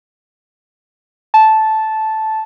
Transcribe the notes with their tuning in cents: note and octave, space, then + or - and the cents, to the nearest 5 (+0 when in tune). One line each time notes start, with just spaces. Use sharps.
A5 -10